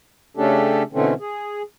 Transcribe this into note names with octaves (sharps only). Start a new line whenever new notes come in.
C#3 A3 C#4 D4 G4 A4
B2 D3 E3 A3 C4 C#4
G#4